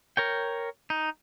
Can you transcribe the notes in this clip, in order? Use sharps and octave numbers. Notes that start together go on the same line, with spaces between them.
A#4 C#5 G5
D#4